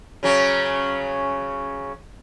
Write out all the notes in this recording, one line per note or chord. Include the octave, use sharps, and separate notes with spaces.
C#3 F#3 C#4